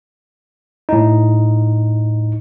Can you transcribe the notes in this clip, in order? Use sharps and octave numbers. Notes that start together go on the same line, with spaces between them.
A2 D#4